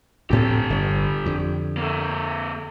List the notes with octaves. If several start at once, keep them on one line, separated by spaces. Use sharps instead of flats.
D2 A2 C4 G4 A4
G1
F2 D3
A#3 A4